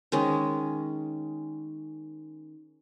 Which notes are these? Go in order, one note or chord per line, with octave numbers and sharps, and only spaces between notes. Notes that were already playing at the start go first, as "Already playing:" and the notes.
D#3 G#3 C#4